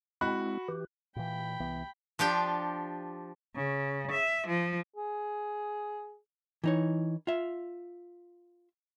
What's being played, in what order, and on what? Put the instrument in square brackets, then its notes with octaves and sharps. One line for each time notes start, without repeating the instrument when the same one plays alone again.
[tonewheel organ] G#3 C4 E4 [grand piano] F#4 B5 F#6
[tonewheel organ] E3 G4
[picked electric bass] A#2 E3 [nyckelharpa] G5 B5
[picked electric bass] C2 E3 B3
[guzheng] F3 D4 G4 G5
[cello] C#3
E5
F3
[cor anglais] G#4
[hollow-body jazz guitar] E3 D#4 C#5
F4 E5